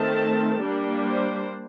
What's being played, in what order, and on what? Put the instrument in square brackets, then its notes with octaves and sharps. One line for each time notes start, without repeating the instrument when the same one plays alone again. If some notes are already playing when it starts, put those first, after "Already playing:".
Already playing: [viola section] D#3 A3 C4 A5
G3 A#3 D4
C5